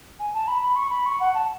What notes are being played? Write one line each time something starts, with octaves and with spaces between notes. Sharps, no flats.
G#5
A5
B5
B5
C#6
B5
C#6
F#5
A5